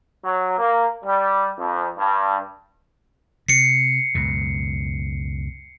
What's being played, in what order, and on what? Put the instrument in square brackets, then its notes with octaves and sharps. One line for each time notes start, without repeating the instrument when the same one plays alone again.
[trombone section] F#3
A#3
G3
F2
G2
[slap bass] C3 [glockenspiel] C7 C#7
[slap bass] C#2 F#2 B2